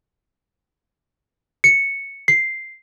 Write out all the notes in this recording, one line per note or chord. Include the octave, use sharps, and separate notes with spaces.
C#7
C7